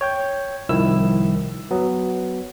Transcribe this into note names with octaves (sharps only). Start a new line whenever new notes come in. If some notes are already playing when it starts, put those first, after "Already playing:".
C#5 G5 G6
C2 D#3 F3 E4 E6
F#3 B3